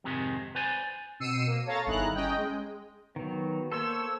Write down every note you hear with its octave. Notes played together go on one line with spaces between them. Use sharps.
F2 G#2 C3 D#3 G#3
B4 C5 D5 G#5
B2 C4 E6 C7 C#7 D#7
A#3
A4 C#5 F5 A#5 A6
G1 D#3 E4 G#4 A#5 F#6
C#4 D#5 G5
G#3
D#3 F#3 B3
A#3 A4 C5 C#5 E6